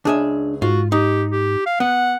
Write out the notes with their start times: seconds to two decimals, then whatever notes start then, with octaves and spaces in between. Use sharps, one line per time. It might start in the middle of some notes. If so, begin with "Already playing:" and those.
0.05 C#2 D4 G#4 E5
0.62 G#2 F4 F#4
0.92 D#4 G4
1.31 G4
1.66 F5
1.80 B3 F#5